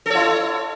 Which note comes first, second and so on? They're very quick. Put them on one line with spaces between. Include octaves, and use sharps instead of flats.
A4 C#5 E4